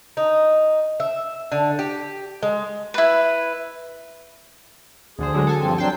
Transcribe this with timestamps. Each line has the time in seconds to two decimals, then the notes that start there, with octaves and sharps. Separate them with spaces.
0.17 D#4
1.00 E5
1.52 D3
1.79 G4
2.43 G#3
2.94 E4 B4
5.19 D2 D3 G#4 C5
5.34 D3 F#3 G#3
5.47 A4 G#5 A5
5.60 G2 F3 C4
5.78 F#3 C4 D4 G5 A5 C7